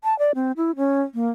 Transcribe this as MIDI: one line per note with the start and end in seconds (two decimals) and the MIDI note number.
0.04 0.17 81
0.19 0.32 74
0.35 0.52 60
0.57 0.76 64
0.76 1.02 61
1.14 1.28 58